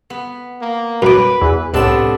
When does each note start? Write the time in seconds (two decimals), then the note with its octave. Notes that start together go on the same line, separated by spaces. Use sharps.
0.10 B3
0.61 A#3
1.02 F#2 B4 D6
1.41 E2 E3
1.74 C2 A2 C3 B3 D4 A4 E7